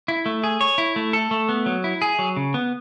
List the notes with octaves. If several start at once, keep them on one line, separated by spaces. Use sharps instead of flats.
E4
A3
G#4
C#5
E4
A3
A4
A3
B3
F#3
E4
G#4
F#3
C#3
B3